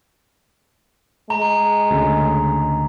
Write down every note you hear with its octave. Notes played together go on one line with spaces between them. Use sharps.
G#3 A#5
D2 C#3